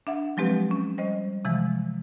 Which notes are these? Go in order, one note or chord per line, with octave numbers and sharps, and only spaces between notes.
D4 E5 F#5
F3 F#3 G#3 C4 G4 B4
C#4
G3 C5 D#5
C3 E3 F3 G#3